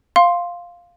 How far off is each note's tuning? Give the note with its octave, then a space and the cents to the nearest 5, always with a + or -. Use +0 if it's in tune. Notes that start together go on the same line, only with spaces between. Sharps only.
F5 +0 C6 +0